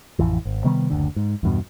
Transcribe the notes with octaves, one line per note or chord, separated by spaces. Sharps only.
A1 F2 E3
G#1
C3 D#3 G3 B3
F#1 D2 D3
G#2
E2 G2 B2